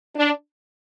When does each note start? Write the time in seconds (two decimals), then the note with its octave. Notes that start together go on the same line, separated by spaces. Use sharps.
0.16 D4